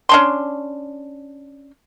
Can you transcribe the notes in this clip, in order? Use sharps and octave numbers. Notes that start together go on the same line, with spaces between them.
C#4 D4 C6